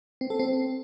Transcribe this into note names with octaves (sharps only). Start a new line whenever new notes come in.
C4
A4
C4